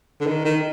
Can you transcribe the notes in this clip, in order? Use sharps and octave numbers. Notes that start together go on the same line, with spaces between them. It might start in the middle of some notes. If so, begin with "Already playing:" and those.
D3
D#3
D#3